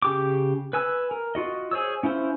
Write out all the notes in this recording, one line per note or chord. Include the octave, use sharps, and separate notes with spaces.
C#3 G4 D6
B4 G#5 E6
A#4
F4 F#4 D#5
G#4 C5 C#5 E6
C#4 E4 F4 C5